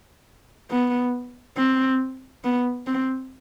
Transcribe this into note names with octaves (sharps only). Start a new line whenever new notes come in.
B3
C4
B3
C4